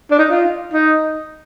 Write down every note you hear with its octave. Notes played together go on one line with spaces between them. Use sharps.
D4
D#4
F4
D#4